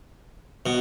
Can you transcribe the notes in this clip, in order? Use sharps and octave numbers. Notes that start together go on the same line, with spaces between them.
B2